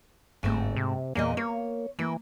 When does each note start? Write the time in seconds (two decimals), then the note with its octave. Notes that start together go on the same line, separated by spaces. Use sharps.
0.43 G1 G#2 A3 C4
0.76 C3
1.15 E2 A#2 A#3 D#5
1.37 A#3 C#5
1.99 E3 A#3